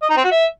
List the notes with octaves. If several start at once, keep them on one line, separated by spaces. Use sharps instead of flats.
D#5
D#4
C4
F#4
E5